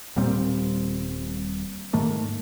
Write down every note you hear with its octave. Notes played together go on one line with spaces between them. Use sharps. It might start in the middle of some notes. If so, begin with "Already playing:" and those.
D#1 A#2 G3 C4
G#2 D#3 A3 A#3